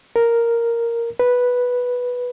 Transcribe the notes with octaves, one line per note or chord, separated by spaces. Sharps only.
A#4
B4